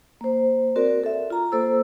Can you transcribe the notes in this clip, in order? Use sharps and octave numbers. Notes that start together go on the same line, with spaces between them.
A#3 C5
C4 F#4 A#4 D5
A4 E5
F4 A#5
A#3 A4 C5 E6